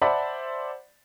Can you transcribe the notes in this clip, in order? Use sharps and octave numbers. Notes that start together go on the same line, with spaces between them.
C5 D5 E5 F#5 A5 B5